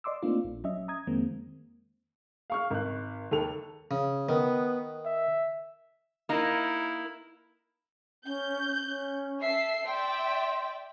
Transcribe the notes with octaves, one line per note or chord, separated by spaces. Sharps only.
D5 D#5 C6 D6 E6
A3 A#3 C4 D4 D#4 F4
A#1
F#3 C#4 D#5 E5
A#5 D#6 G#6
F2 D#3 G#3 A#3 C4
F5 C#6 F6
G#1 F#6
D#2 A4 F7
C#3
D#3 B3
E5
A#3 D#4 E4 A#4
C#4 G6
C#4
A4 E5 C7
D5 E5 G5 C6